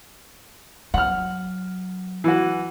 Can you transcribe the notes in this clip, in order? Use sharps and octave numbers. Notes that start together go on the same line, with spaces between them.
F#3 F#5 F6
E3 F#4